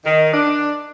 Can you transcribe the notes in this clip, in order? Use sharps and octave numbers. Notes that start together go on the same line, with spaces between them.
D#3
D4